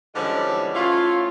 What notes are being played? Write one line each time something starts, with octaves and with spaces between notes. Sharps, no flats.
D3 E3 F3 G3 G#3 C#4
A3 C#4 E4 F4